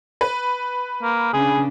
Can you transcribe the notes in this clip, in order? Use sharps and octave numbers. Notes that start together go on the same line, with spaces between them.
B4
A#3
C#3 D4 G#4